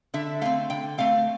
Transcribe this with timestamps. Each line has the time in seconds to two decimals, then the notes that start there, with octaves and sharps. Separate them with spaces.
0.14 D3 E5
0.41 A3 C4 F5
0.70 D3 G5
0.98 A3 C4 F5